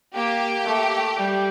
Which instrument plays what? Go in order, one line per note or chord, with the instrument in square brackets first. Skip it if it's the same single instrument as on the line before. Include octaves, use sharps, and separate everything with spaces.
[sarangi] A#3 [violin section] G4
[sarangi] A3
G3